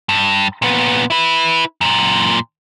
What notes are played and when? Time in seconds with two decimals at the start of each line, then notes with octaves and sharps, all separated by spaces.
0.09 G2
0.62 A#2 B3
1.10 E4 B4
1.81 F#2 A#2